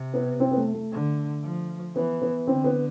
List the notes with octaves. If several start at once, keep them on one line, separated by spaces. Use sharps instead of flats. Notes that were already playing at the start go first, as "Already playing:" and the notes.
Already playing: C3
B3
C4
B3
A3
A3
D3
F3
E3 B3
B3
D3 C4
B3